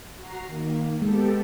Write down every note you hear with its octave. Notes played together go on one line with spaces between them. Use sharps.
F#4 A#5 C7
D#3 A#3
G#3 B3 G4 A4